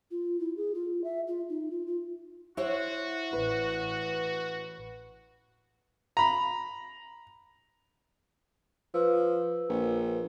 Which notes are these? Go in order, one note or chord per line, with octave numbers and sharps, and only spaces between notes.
F4
E4
G#4
F4
E5
F4
D#4
F4
F4
E4 F#4 C5 C#5
A1 B4
A#5 B5
F3 B4 E6
A#1